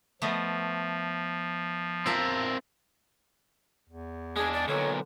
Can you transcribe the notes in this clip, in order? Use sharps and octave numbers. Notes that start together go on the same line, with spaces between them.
F3 A3 B3 D#5
C4 F4 A#4 E5 A5
E2
G#3 D4 G#4
D5
B1 A#2 D3 C#5